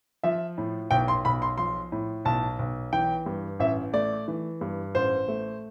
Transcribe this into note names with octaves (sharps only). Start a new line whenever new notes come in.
F3 E5
A2
B1 G5
C6
B1 B5
C6
F3 C6
A2
B1 A5
B1
E3 G5
G2
A1 E5
A3 D5
E3
G2
A1 C5
A3